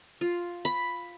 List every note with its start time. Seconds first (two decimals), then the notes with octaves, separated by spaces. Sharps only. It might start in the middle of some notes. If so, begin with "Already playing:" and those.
0.21 F4
0.65 B5